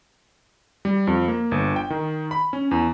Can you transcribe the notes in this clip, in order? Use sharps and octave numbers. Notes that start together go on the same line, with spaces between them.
G3
F2
A#3
G1
G5
D#3
B5
C#4
E2